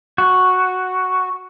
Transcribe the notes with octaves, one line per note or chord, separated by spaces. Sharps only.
F#4